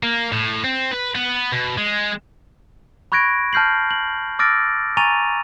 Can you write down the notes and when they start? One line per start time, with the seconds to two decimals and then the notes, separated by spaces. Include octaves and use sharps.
0.03 A#3
0.32 A2
0.64 C4
0.91 B4
1.15 B3
1.53 B2
1.78 G#3
3.12 B5 C#6 F#6 G#6 A#6 D7
3.53 A5 F6 G6 C7 F#7
3.91 F#7
4.39 D6 E6 F6 A6 A#6 D7
4.97 G#5 A#5 C#6 A6 D#7 F7